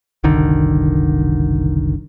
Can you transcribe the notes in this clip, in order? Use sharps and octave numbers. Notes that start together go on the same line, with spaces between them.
F#1 C2 D3 D#3